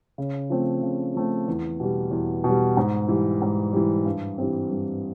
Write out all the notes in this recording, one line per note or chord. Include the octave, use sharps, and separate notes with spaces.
C#3
F3 A3 C4
C#3
F3 A3 C4
E2
B2 G3
E2
B2 G3
G#2
E3 G3
G#2
E3 G3
G2
E3 G3 C4
G2